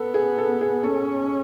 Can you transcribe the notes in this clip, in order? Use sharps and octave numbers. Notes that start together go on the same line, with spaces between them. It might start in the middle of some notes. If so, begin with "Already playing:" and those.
Already playing: B3 A4
G#4
A4
G#4
C#4 A4